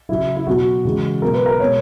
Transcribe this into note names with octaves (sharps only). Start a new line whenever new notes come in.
C#3 F#3 E4
E4
B2 F#3 F#4
C#3 E3 G#3
B2 F#3 A#4
B4
A#4
B2 G#3 C#5